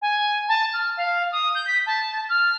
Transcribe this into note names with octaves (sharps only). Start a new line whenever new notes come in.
G#5
A5
F6
F5
D#6
G6
B6
A5
F6